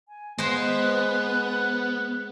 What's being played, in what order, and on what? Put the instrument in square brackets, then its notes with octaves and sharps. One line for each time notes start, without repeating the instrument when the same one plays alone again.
[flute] G#5
[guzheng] G#3 C5 [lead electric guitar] B3 [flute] F#6